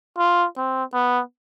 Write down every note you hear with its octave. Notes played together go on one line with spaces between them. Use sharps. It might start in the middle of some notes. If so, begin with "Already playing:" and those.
F4
C4
B3